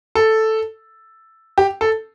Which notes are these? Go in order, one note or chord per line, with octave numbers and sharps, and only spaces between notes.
A4
G4
A4